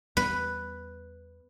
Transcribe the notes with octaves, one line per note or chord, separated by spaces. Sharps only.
E2 G3 B3 B4